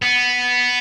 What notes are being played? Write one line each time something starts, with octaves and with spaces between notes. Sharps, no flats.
B3